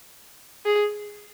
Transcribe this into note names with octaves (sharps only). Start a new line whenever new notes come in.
G#4